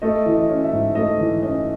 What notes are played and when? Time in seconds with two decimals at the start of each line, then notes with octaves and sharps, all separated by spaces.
0.02 A3 D#5
0.26 E3
0.34 D#5
0.49 C#4
0.64 E5
0.72 G#2
0.95 A3 D#5
1.19 E3
1.43 C#4 D#5